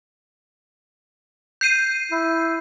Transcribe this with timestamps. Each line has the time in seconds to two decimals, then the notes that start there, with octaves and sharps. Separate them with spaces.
1.61 G6 C7 D#7
2.12 E4